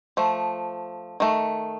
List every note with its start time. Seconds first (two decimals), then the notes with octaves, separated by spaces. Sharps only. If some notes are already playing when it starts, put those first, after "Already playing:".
0.17 F3 A3
1.20 D#3 A3